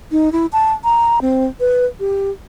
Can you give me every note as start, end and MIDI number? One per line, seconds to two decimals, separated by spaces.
0.12 0.31 63
0.32 0.46 64
0.53 0.72 81
0.84 1.19 82
1.21 1.46 60
1.60 1.85 71
2.00 2.30 67